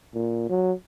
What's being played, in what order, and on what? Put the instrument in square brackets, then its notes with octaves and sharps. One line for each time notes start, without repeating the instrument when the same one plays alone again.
[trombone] A#2
F#3